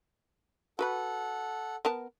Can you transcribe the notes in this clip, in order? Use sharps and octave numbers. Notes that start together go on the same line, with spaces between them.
F#4 A4 B4 F#5 B5
B3 A#4 A5